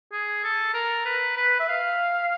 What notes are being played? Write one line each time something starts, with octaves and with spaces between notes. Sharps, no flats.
G#4
A4
A#4
B4
B4
E5
F5